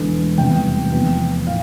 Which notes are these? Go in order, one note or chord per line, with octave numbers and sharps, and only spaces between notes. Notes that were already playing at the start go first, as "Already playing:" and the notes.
Already playing: E1 E2 D3 A3
F1 E2 C3 G3 B3 G5
E2 C3 F3 B3
A2 F5